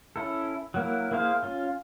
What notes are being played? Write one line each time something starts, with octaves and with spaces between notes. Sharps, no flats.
C#4 E4 A4
F#3 A#3 E4
A#3 E4 G#4 C5 F5
C#4 F4